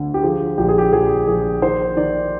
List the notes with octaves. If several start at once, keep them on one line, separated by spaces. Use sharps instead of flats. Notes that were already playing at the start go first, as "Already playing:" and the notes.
Already playing: D2 D3
G4
F3 G#4
A#1 G4
G#4
G4
A#1 G#4
A#1 G#4
D#3 C5
D#3 D5